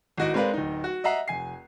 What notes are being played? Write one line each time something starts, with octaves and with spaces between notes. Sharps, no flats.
G#1 A2 F#4 D#5 D7
G#3 C4 A#4 B4 D5 F5
D1 D#4
F#4
D#5 E5 F#5 A#5 C7
F1 G#5 C7